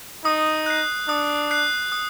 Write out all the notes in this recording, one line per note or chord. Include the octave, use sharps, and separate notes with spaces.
D#4 D#6
F#6 C7
D4 D#6
F#6 C7
D#6